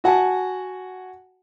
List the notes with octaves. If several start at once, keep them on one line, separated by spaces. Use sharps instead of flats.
F#4 F#5 G#5 A5